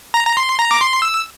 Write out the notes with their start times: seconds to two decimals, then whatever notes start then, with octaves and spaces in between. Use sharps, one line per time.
0.14 A#5
0.26 A#5
0.37 C6
0.59 A#5
0.71 D6
0.81 C6
1.02 E6